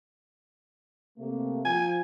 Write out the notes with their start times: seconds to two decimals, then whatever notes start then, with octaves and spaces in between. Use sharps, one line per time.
1.18 C3 A3 A#3
1.65 F3 F4 G#5